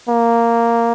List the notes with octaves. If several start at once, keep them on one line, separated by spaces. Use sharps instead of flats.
A#3